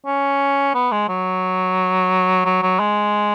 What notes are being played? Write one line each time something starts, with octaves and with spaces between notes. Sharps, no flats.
C#4
B3
G#3
F#3
F#3
F#3
G#3